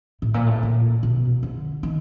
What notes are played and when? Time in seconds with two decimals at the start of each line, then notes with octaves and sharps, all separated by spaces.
0.22 A2
0.34 A#2
0.46 A2
0.63 A#2
1.03 B2
1.43 D3
1.83 D#3